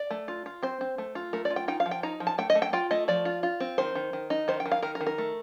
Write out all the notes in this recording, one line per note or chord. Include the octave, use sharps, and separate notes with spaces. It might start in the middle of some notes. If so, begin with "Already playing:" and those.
Already playing: D5
A3
F4
F4
C4 C5
C4
A3
F4
A3 A#4
D5
F4
G5
D#4 G5
F5
F3
G5
D#4 A#5
F3
A5
A3 G5
D#5
A3
G5
F4 G5
A3 D#5
F3 D5
F4
F4
C4
D#3 C5
D#3
D#3
D#4
D#3 C5
G5
D#3
F5
D#3 A#4
A#4
D#3
A#4
A3